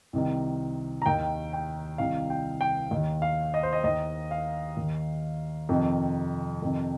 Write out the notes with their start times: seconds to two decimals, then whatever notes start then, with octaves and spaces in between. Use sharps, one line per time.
0.13 C2 C3 D#3
1.02 A#5
1.06 D#2 D#3 G5
1.53 G5
1.98 C2 C3 D#3 F5
2.30 G5
2.61 G5
2.91 D#2 D#3
3.22 F5
3.54 D#5
3.63 C5
3.73 D#5
3.84 D#2 D#3 D#5
4.31 F5
4.77 D#2 D#3
5.69 F2 C3 D#3
6.62 F2 C3 D#3